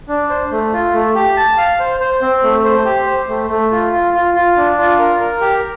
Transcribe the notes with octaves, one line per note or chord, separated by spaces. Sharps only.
D4
C5
A3
F4
A3
G4
A5
F5
C5
C5
C4
A3
C5
G4
C5
A3
A3
F4
F4
F4
F4
D4
F4
A#4
A#4
G4